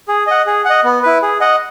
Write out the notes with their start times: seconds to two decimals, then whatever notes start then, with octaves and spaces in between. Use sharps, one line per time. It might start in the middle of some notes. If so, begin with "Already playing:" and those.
0.08 G#4
0.27 D#5 F#5
0.46 G#4
0.65 D#5 F#5
0.84 B3
1.03 E4 B4
1.22 G#4
1.41 D#5 F#5